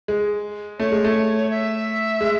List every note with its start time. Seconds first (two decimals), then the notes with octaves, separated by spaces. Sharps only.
0.08 G#3
0.79 A3 C#5
0.92 G#3
1.04 A3
1.50 E5
2.21 G#3